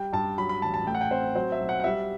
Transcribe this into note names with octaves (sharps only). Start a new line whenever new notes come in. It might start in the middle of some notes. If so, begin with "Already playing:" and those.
Already playing: G3 G5
G2 A5
F#3 B5
B5
A1 A5
A5
A3 G5
F#5
G5
C4 C5
F#3 C5
E5
B1
F#5
F#5
G3 E5